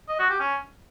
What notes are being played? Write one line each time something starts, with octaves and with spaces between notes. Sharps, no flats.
D#5
F#4
G4
C#4